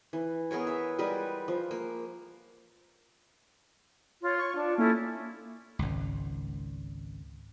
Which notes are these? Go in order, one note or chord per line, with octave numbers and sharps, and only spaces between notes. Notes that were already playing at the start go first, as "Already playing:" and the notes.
E3
B3 G#4 A#4 C#5
E5
G3 G#3 A#4 B4
F3
A#3
F4 C#5
C#5 C#6
D4 F4
A#3 C#4 E4 A4
G#1 C#2